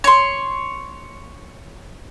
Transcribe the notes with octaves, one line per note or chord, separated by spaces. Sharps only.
C#5 C6